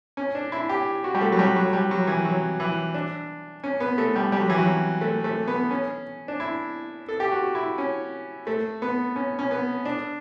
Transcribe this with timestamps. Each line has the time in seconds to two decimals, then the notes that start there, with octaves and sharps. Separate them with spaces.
0.17 C#4
0.35 D4
0.52 E4
0.69 G4
1.04 F#4
1.15 G3
1.21 A3
1.32 F#3
1.39 G3
1.56 F#3
1.73 G3
1.91 F#3
2.07 E3
2.25 F#3
2.60 E3
2.94 D4
3.64 C#4
3.80 B3
3.98 A3
4.16 G3
4.32 G3
4.41 F#3
4.50 E3
4.58 F#3
5.01 A3
5.24 A3
5.47 B3
5.71 C#4
6.28 D4
6.40 E4
7.09 A4
7.20 G4
7.32 F#4
7.55 E4
7.78 C#4
8.47 A3
8.82 B3
9.16 C#4
9.39 C#4
9.51 B3
9.85 D4